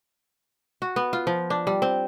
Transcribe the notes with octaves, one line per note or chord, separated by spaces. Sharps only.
F#4
B3
F4
F3
D4
G3
C4